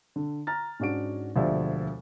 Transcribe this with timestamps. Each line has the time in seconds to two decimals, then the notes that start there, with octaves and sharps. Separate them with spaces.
0.16 D3
0.47 A#5 F6 A6
0.79 G#2 C#4 D4 F#4 D7
1.35 E1 D2 F3 G4 D5 E5